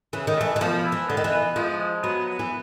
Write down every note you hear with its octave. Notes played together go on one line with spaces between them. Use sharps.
C#3 E3
D#3
E3 A3
E3
B2 F3
E4
E3
D3 B3
D#3
E3
B3
F3 G#3
G#3
F#3 B3
B3
E3